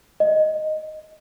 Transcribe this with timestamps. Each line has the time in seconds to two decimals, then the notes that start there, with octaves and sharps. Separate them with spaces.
0.20 D#5